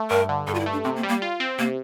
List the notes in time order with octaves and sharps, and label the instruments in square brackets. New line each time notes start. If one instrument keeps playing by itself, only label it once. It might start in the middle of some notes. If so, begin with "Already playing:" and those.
Already playing: [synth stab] A3
[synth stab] G2 [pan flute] A#4
[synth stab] D3
[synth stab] G2 [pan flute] A4
[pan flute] F4
E4
[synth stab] A3
[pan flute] D4
[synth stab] C3 [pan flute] C4
[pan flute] A#3
[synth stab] G3
[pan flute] A#3
[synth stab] F4
C4
[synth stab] C3 [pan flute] A#3